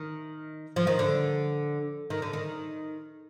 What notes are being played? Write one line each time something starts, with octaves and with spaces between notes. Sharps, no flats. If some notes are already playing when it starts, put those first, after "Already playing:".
Already playing: D#3
F3
D#3
D3
D#3
D3
D#3